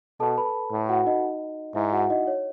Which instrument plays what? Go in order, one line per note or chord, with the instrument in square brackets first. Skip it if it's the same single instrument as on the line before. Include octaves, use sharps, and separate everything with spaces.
[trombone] B2 [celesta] A4 A5
[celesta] B4 B5
[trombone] A2
[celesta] F#4 F#5
D#4 D#5
[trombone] G#2 [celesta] E4 E5
[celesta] F#4 F#5
D#4 D#5
C#5